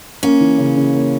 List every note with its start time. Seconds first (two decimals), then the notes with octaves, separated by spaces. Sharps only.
0.23 A#3 C#4
0.40 E3
0.58 C#3
0.77 C#3
0.95 A#3